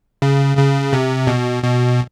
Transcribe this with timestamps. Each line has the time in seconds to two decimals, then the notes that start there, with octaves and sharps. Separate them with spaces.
0.22 C#3
0.57 C#3
0.93 C3
1.27 B2
1.63 B2